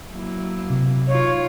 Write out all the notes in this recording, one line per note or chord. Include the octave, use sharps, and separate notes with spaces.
F#3 A#3 E4
C3
D#4 F4 C#5